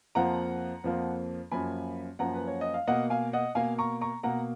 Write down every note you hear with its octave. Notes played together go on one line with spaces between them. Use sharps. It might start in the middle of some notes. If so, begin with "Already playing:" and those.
F2 F3 A#3 F#5 A#5
F2 F3 A#3
F#2 F3 A#3 G#5 B5
F#2 F3 A#3 F#5 A#5
B4
C#5
D#5
F5
B2 A#3 D#5 F#5
F5 G#5
D#5 F#5
B2 A#3 F5 G#5
A#5 C#6
A#5 C#6
B2 A#3 F#5 A#5